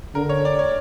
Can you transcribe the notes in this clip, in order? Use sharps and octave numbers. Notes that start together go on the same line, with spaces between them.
D3 A#4
C#5
D5
C#5